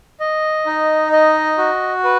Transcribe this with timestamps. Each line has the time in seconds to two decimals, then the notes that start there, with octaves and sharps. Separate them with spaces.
0.20 D#5
0.66 D#4
1.12 D#5
1.58 F#4
2.04 B4